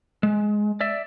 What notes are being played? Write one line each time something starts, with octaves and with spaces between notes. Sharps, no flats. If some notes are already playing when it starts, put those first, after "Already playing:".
G#3
D5 E5